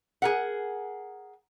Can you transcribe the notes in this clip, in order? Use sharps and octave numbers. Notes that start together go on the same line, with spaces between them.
G#4 A#4 F#5